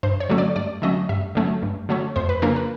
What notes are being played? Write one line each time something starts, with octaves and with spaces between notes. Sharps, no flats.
G2 C5
C#5
D3 F#3 A3 C#4
D5
G2 D5
D3 F#3 A3 C#4 D#5
G2 E5
D3 F#3 A3 C#4
G2
D3 F#3 A3 C#4
F2 C5
B4
C#3 F3 A#3 D4 A#4
B4